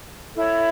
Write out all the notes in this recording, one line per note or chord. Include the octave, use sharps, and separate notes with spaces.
E4 A4 C#5